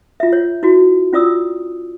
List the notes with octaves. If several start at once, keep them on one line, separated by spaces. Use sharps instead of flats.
F4 E5
C#5
E4 F#4
C#4 F4 D5 D#6 E6